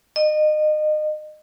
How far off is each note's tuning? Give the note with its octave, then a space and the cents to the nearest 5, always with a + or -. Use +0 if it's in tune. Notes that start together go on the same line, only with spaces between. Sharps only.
D#5 -30